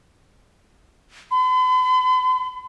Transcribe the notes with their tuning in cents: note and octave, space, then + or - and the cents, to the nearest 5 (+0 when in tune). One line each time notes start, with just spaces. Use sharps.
B5 +45